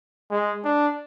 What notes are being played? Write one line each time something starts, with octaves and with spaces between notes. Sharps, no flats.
G#3
D4